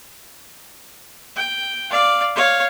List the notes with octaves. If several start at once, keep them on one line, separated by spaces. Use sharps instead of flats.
G5
D5 F5
C#5 F5